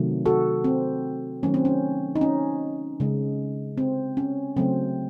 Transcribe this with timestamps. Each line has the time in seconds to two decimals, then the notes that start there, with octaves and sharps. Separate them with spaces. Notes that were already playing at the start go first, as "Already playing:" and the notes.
Already playing: C3 D#3 F#3 A3
0.26 F#4 A4
0.64 C4
1.43 D#3 F#3 A3 C#4
1.54 C4
1.65 C#4
2.16 D#4
2.21 C#4
3.00 C#3 G#3
3.77 C4
4.17 C#4
4.56 C#3 F#3 A3 C4